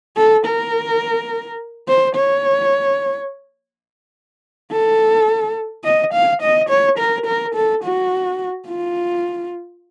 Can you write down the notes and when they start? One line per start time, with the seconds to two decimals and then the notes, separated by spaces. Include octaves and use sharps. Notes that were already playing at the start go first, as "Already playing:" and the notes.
0.17 A4
0.46 A#4
1.88 C5
2.16 C#5
4.72 A4
5.85 D#5
6.14 F5
6.42 D#5
6.69 C#5
6.99 A#4
7.26 A#4
7.55 A4
7.84 F#4
8.68 F4